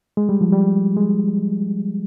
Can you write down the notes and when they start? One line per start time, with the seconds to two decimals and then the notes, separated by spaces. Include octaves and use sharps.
0.17 G#3
0.29 G3
0.41 F3
0.52 G3
0.97 G#3